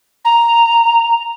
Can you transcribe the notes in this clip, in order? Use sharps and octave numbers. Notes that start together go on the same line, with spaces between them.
A#5